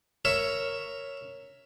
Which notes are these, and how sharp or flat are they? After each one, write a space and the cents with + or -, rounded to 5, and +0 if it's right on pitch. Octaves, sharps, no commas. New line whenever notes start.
A#4 +0 C#5 +0 E5 +10